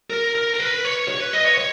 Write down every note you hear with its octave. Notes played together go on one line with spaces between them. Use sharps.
A#4
A#4
A#4
B4
C#5
C#5
B4
D#5
C#5
C#5